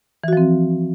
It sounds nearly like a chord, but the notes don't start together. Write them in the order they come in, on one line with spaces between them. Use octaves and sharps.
E3 F#4 F3 C4